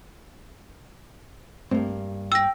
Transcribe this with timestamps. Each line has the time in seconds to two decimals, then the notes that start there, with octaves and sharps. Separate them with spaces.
1.71 G2 A3 A#3 C4
2.32 G5 E6 A#6